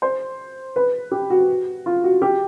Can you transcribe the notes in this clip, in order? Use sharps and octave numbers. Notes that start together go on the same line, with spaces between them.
C5
B4
G4
F#4
F4
F#4
G4